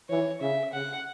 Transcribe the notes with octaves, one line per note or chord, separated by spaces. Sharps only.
E3 C#5
C#3 E5
C#3 F#5